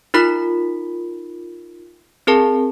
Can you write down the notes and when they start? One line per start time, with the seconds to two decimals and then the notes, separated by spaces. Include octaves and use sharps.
0.14 D#4 F4 A#4 B5 B6
2.27 C4 G#4 A#4 A5